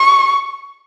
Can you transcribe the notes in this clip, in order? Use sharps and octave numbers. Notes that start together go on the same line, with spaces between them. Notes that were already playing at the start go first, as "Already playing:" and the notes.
Already playing: C#6